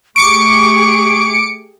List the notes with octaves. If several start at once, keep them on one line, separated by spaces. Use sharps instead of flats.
A3 G4 G#4 C#6 D6 C#7 D7